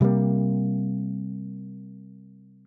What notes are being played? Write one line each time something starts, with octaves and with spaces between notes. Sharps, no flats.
C3 G3 G#3 A#3